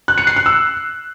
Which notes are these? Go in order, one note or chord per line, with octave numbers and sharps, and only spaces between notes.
F#6
C#7
C7
F#6
E6